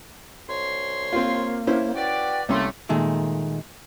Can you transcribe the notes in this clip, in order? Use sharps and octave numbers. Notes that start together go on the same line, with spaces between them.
C2 C#5 C6
A#3 C4 F4
C#4 E4 C5
F#4 B4 D5 G5
C2 A3 A#3 C#4 C6
A#2 D#3 G#3 A3